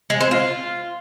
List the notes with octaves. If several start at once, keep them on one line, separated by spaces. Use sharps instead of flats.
G#3
C4
F4